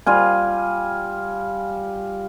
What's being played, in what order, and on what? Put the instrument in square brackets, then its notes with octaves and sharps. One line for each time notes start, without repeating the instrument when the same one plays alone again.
[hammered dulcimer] G3 F4 G#5